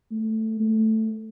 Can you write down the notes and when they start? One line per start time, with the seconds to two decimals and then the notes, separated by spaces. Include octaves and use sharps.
0.11 A3
0.60 A3